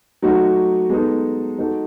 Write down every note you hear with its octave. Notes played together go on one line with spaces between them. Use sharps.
F#3 A3 D#4 F#4
G#3 B3 D#4 A4
G#3 D#4 F#4 A4